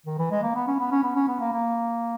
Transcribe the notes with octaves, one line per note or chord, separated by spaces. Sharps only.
D#3
E3
G#3
A#3
B3
C#4
B3
C#4
B3
C#4
B3
A#3
A#3